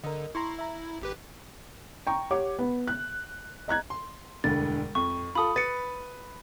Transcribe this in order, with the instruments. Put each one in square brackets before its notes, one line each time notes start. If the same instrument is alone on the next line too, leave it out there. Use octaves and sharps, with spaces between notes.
[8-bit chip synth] D3 [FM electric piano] A#4 D#5
[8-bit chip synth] E4 [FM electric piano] A#5 C6 C#6
[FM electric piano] E5 A#5
[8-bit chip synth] G#1 G4 B4
[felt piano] G5 A#5 C#6
G4 C#5 F#5 D6
B3
F#6
D#5 A#5 F#6 G#6
[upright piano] C6
[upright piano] E1 D2 G2 [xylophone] A6
[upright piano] F2 [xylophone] C#6
[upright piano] F4 A4 [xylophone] B5 D#6
[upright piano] B4 [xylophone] A6 C#7